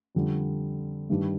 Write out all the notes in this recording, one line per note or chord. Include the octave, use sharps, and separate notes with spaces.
F2 D3 G3
G2 D#3 G3 D4